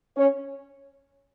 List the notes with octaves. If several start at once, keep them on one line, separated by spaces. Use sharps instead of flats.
C#4 C#5